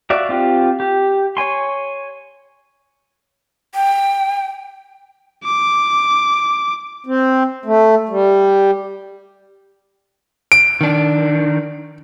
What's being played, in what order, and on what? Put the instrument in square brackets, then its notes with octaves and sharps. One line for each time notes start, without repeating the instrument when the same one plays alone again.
[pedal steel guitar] F#4 D5 E5 F5
C4 F4 G4
G4
C#5 G#5 C6
[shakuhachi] G5
[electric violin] D6
[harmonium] C4
A3
G3
[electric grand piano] D7
[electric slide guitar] D#3 D4